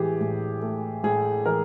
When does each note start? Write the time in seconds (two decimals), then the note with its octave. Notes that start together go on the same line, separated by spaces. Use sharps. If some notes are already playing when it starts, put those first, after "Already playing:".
Already playing: A2 E3 G4 G#4
0.21 A2
0.62 A3
1.04 A2 G#4
1.46 E3 A#4